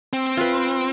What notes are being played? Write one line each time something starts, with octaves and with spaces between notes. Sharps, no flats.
C4
F4 B4